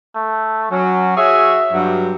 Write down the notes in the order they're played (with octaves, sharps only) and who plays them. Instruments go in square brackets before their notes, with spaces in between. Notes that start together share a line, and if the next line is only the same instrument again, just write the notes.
[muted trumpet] A3
[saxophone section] F#3 [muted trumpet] C#4
[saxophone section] F#4 G#4 C#5 [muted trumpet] E5
[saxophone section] G2 F#3